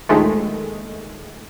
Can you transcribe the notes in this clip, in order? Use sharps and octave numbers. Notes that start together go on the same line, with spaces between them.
A#1 D#2 D#3 G#3 A3